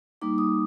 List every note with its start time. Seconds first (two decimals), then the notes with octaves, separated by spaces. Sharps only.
0.22 G3 A#3 D#4 D6
0.38 D#6